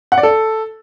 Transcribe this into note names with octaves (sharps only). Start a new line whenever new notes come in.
F#5
D5
A4